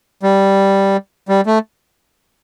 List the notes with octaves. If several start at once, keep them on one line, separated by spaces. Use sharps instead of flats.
G3
G3
A3